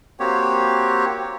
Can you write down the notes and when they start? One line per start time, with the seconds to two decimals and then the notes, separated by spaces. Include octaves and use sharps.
0.20 A#3 C4 F#4 G4 C#5